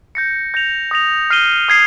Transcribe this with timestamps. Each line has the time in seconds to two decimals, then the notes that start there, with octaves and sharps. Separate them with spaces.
0.15 G6 A#6 C#7
0.54 G6 A#6 F7
0.91 D#6 A#6 F7
1.30 F6 C7 D#7 G7
1.68 D#6 G#6 C7